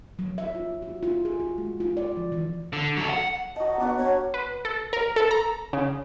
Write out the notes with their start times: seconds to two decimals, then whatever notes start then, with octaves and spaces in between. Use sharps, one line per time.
0.19 F#3
0.38 E5
0.55 F4
0.82 F#4
1.03 F4
1.25 G#4
1.40 F#4
1.58 G#3
1.80 F4
1.97 D5
2.17 F3
2.32 E3
2.73 D3
2.97 F#3 A4
3.10 F#5
3.56 F#3 D#5 A5
3.80 B3 D4 F#4 F#5
3.97 C#5
4.34 B4
4.65 A4
4.93 A#4
5.16 A4
5.31 A#5
5.73 C#3